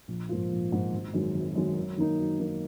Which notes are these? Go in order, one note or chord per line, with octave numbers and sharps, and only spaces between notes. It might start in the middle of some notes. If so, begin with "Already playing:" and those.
A#1
G#2 F3 A#3 F4
A#1
G#2 F3 A#3 F4
G#1
F#2 D#3 G#3
G#1
F#2 D#3 G#3
F#2
D#3 A#3 D#4
F#2
D#3 A#3 D#4